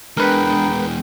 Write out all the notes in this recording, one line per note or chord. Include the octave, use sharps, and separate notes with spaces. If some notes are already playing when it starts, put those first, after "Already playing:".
E2 G#3 D4 G#4 A#4 B4 G5